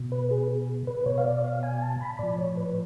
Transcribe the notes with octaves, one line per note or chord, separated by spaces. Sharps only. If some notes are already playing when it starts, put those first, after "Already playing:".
Already playing: B2
B4
G#4
B4
B2 C#5
F5
D5
F5
G#5
A5
B5
A2 F3 D5
C#5
B4